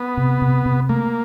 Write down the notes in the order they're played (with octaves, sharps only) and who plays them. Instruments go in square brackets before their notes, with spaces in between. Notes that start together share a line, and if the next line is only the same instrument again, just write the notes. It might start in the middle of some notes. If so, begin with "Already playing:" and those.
Already playing: [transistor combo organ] B3
[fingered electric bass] C3
C3
C3
[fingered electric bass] A3 [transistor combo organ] A#3